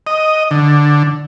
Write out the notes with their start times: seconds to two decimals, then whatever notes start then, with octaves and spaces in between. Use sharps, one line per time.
0.07 D#5
0.51 D3